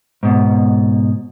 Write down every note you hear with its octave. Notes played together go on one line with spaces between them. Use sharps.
G#2 B2